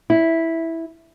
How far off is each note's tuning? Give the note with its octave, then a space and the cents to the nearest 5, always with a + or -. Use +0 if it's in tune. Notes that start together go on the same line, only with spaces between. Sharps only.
E4 -5